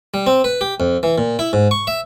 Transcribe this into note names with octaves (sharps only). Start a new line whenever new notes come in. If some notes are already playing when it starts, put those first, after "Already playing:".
G3
C4
B4
G4
F2
E3
A#2
E4
G#2
C#6
E5